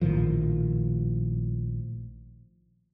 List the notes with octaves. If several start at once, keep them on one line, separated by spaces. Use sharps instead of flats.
A#1 A2 D#3 F3